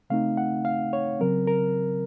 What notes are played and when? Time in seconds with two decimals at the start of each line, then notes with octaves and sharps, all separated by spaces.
0.10 C#3 A3 C4 D#4 F5
0.37 F#5
0.65 F5
0.93 C#5
1.20 C#3 F#3 C4 A#4
1.47 A#4